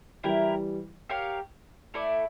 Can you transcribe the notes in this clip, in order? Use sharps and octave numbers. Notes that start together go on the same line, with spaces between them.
E3 G3 E4 G4 A#4
G4 A#4 C#5 F5
A3 E4 A4 D5